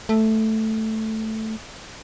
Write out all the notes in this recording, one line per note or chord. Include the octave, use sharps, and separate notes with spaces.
A3